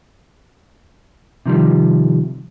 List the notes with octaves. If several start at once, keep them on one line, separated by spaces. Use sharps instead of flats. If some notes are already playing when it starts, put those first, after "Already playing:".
C3 D#3 F3 G3